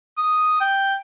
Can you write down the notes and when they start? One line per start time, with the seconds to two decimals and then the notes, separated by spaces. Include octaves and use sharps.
0.17 D#6
0.60 G5